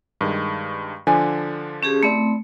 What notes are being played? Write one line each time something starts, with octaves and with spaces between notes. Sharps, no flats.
G2 D#3 G#3
D3 F3 D4 G#5
C#4 G4 G#4
A3 C4 E4 D5